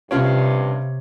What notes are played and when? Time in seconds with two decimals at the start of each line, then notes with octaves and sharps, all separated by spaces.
0.11 G2 C3 C#4 F4 C#5 C6